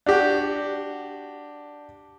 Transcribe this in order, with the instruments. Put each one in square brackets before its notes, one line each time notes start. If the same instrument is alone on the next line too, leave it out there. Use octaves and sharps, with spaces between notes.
[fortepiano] D4 F#4 G4